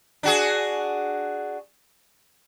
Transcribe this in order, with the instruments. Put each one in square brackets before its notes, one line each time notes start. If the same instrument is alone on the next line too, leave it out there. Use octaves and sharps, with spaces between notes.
[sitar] D4 F#4 G#4